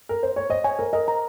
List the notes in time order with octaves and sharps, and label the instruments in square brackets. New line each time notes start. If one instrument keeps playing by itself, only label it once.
[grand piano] A#4
C5
C#5
[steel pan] C5 [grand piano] D#5
[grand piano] C#5 [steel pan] G#5
[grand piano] A#4 [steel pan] C5
[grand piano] A#4 [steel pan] D#5
[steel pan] A#5